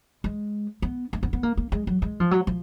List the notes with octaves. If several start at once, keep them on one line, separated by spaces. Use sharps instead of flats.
G#3
B3
A#3
B3
B3
A#3
A#3
G#3
F#3
G#3
F3
F#3
F3